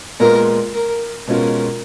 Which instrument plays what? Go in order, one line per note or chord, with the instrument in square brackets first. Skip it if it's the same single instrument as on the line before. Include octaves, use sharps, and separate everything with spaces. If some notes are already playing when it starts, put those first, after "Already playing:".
[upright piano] A#2 G#3 B3 F4 [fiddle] A#4
[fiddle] A#4
[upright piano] B2 G#3 C#4 F4 [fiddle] A#4